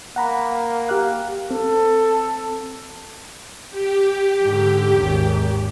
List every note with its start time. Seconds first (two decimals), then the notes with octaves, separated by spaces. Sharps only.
0.16 A#3 F#5 A#5 B5
0.89 G4 F5 F#6
1.51 C4 A4
3.70 G4
4.43 G#2 D3
4.98 G#1 D#2